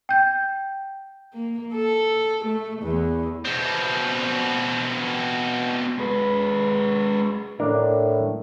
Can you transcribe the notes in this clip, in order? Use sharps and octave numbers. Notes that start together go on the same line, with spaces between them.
G5 G6
A#3
A4
A3
E2
B2 C4
G#3 B4
A2 D4 A#4